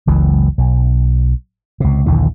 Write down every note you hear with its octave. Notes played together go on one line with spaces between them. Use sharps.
F#1 C#2 E3 G#3
B1
C#2 C3
A#1 D#2 D3 E3